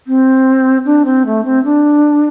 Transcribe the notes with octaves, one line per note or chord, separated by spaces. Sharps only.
C4
D4
C4
A3
C4
D4